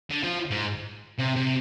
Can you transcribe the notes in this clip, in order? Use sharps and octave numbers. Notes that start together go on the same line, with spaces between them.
D3
F3
G#2
C3
C3